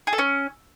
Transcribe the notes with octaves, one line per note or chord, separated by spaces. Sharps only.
G#4
A4
C#4